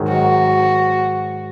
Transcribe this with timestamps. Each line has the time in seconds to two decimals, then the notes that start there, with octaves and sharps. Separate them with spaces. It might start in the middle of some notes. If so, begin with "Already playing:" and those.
Already playing: G#2 D#3 F#3
0.08 F#4